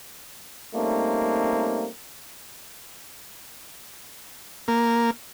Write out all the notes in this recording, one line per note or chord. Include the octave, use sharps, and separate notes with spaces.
G3 A3 A#3 C4 C#4 D#4
A#3